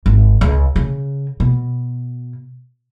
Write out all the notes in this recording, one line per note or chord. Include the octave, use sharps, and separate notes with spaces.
G#1
C#2
C#3
B2